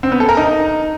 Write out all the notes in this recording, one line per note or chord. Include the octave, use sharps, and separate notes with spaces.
C4
B3
A4
A#4
D#4